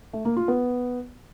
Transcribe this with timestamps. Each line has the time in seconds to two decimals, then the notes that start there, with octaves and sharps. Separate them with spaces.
0.13 A3
0.25 A#3
0.37 F4
0.48 B3